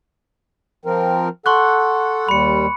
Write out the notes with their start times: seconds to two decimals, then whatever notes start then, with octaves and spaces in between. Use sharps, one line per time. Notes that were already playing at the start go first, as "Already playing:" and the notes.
0.85 F3 C4 A#4
1.46 A4 F#5 C6 C#6 F#6
2.29 D#2 G3 B5 C#7